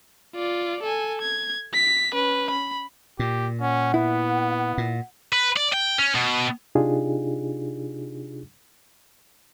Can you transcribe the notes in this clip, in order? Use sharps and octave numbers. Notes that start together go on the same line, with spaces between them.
F4 D5
A4 G#5
G#6
B6
C#4 B4
B5
A#2 G4
C#4 F#5
B3 E4
A#2
B4
D5
G5
C#4
B2
C3 D4 D#4 F4 G4 G#4